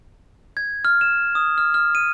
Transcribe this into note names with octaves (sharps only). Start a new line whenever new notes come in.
G#6
F6
E7
D#6
F6
F6
D#7